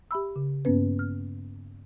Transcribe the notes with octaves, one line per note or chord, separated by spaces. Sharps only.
G4 E5 B5 E6
C#3
G2 A#3 B3 C#4 B4
F6